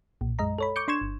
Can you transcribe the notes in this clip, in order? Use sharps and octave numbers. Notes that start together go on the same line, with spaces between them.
B1 A#2
F#2 G#3 D#5 A#5
A4 C#5 B5
C#6 D6 G6 C#7
D4 C6 C#6 G#6 E7
G1